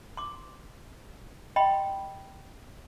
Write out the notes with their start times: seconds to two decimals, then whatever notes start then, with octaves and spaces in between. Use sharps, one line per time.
0.17 C6 D6
1.56 D#5 G5 B5 C6